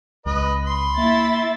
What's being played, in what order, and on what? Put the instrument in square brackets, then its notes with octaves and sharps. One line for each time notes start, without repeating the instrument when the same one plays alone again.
[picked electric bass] C#2 [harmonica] B4 D#5
[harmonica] B5 C6
[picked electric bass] A#3 [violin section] E4 E5 A6